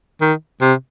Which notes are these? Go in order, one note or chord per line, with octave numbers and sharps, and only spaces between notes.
D#3
C3